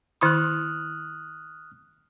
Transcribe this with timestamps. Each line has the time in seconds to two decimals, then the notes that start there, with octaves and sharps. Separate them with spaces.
0.21 D#3 E4 B5 D#6 F6 F#6